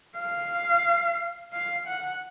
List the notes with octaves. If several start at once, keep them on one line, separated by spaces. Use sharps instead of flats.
F5
F5
F#5